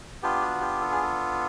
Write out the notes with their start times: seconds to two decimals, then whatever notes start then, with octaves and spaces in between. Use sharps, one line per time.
0.23 B3 D4 F4 G4
0.42 F#4
0.61 G4
0.81 A4
0.91 G#4
1.03 A4